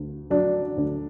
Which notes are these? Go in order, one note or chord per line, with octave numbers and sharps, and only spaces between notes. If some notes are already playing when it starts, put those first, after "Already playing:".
Already playing: D2
F#3 D4
D2